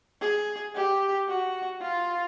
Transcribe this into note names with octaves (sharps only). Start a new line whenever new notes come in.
G#4
G4
F#4
F4